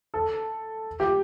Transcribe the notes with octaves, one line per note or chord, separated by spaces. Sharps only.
A4
G4